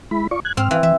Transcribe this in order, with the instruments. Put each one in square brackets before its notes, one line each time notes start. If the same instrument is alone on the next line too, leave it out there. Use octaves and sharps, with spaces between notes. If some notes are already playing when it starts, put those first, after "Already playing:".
[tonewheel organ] G#3 E4 B5
F4 D5 C#6
F#6 G#6
[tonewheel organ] G#2 F6 [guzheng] C4
[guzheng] E3 [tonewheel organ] F5
[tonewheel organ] E3 [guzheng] E5